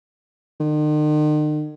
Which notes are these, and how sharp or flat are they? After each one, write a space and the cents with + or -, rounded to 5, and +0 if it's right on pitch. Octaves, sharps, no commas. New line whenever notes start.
D#3 -45